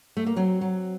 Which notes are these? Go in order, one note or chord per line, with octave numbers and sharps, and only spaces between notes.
A3
A#3
F#3 C4
F#3